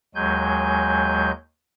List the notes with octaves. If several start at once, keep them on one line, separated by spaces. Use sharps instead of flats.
D#2 F#3 G#3 G#5 G6